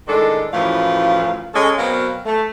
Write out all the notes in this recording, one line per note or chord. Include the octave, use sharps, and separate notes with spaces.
A2 D#3 G#3 D4 A4
F#2 A2 E3 F3 F5
G#3 C#4 A4
B2 F#3 C4 A#4 D5 F5
A3